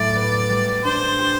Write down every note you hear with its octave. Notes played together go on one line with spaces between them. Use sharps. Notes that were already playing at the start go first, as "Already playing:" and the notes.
Already playing: A2 F#3 A3 D5
B3
G3
D4 C5
G4